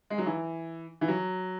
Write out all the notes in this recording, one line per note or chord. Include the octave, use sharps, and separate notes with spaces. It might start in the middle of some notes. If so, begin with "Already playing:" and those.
G#3
F#3
E3
E3
F#3